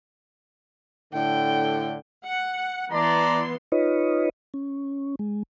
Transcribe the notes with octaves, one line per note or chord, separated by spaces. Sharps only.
A2 D3 G5
F#5
E3 B3 D5 A5 A#5 C6
D#4 F4 B4 C#5 D#5
C#4
G#3